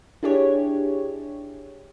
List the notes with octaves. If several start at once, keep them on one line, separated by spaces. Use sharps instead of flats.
D4 E4 G4 G#4 C#5